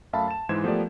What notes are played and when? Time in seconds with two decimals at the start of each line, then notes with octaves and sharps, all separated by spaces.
0.13 F#2 A3 E5 F5 A5 B5
0.28 A5 E7
0.49 G#2 E3 G#3 C5 G#6 E7
0.64 F3 A3 B3 G4 A#4 D5